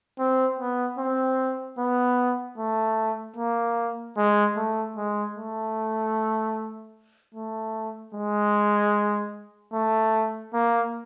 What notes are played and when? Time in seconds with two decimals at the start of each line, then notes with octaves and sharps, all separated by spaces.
0.19 C4
0.59 B3
0.99 C4
1.78 B3
2.58 A3
3.37 A#3
4.17 G#3
4.56 A3
4.96 G#3
5.36 A3
7.34 A3
8.14 G#3
9.73 A3
10.54 A#3